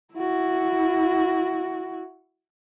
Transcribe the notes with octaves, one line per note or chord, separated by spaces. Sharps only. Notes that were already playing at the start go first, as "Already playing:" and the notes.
E4 F#4